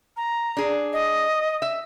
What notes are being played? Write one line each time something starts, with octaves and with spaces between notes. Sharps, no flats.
A#5
D4 G#4
D#5
E5